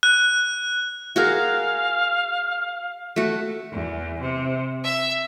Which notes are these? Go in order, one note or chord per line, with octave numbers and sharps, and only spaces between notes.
F#6
F#4 G#4 A#4 F5
A3 F#4
E2
C3
E5